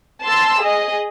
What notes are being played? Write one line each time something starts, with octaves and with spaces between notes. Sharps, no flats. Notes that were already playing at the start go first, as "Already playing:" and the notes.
A5 C6 E6
G#4 D#5